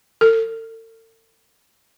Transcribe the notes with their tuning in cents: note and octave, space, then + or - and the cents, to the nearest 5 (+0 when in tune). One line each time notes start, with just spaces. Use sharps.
A4 +40